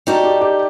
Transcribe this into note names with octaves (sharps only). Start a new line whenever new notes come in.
G3 D#4 F#4 A4
G4
G4